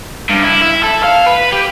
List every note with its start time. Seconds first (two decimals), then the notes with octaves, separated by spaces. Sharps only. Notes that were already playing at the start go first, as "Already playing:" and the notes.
0.29 G2
0.42 E4
0.62 E4
0.84 A4
1.04 F5
1.27 B4
1.52 G4